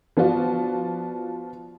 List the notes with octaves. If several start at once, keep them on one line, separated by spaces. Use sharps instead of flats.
F3 B3 D4 F4 F#4